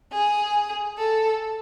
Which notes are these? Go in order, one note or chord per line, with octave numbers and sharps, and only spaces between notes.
G#4
A4